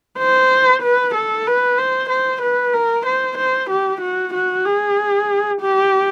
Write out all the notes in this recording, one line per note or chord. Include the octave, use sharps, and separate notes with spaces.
C5
B4
A4
B4
C5
C5
B4
A#4
C5
C5
G4
F#4
F#4
G#4
G4